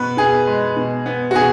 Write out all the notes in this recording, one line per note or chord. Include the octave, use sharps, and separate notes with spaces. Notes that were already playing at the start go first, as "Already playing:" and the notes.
Already playing: B2 B3 B4
B2 G#4
G#3
B2
B3
F#4
B2 G#4